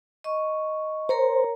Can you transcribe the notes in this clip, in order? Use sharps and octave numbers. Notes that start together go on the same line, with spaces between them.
D#5 C#6
A#4 C5 C#5 A#5